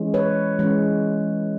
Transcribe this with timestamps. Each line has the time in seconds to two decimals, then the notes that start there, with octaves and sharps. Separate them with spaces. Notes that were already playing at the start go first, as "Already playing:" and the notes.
Already playing: E3 G#3 C#4
0.14 B4 C#5
0.59 E3 G#3 C#4